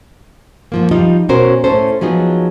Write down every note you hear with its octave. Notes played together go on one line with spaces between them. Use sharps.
G#2 F3 A#3
F3 G3 D#4 F4 D#5
B2 C#4 F#4 A#4 C5
A2 C#4 A4 C5
F3 F#3 B3 D#4 G#4